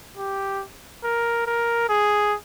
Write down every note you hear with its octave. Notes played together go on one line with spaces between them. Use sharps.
G4
A#4
A#4
G#4